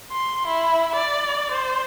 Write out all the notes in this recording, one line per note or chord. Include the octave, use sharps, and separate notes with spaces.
C6
E4
D5
C5